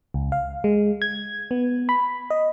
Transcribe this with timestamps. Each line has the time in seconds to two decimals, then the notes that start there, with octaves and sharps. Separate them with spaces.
0.14 C#2
0.32 F5
0.64 G#3
1.02 G#6
1.51 B3
1.89 B5
2.30 D#5